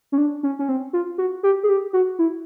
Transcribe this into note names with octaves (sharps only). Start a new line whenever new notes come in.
C#4
D4
C#4
C#4
C4
F4
F#4
G4
G#4
G4
F#4
E4